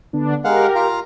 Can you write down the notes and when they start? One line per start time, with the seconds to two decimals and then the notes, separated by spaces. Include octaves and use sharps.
0.13 D3 B3 D4
0.45 G#3 G4 A#4 F5 F#5
0.75 F4 F5 A#5